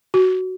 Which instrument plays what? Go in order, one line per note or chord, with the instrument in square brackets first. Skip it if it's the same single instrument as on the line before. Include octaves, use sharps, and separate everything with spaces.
[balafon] F#4